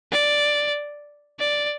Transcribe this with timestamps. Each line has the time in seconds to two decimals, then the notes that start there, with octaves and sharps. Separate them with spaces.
0.12 D5
1.40 D5